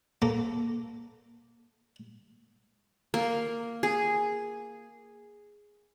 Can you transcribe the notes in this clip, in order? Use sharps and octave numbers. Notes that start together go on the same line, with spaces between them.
A#3 A4
A#3
G#4